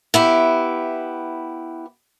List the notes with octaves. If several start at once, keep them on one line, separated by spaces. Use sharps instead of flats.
B3 E4 G4